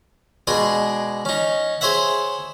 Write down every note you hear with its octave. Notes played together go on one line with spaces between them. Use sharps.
B2 G#3 D4 G#4 G#5
C#4 D#4
G#4 C5 C#5 E5 F#5